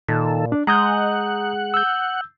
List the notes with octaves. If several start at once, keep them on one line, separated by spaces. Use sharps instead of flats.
A#2 D#3 A4
D4
G#3 F#5 A#5 D#6 G6
E6 G6